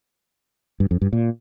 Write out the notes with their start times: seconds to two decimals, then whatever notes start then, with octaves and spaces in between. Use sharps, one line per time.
0.80 G2
0.91 F2
1.02 G2
1.13 A#2